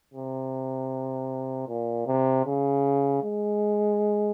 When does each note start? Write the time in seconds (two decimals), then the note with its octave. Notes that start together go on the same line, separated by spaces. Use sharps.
0.14 C3
1.68 A#2
2.06 C3
2.45 C#3
3.23 G#3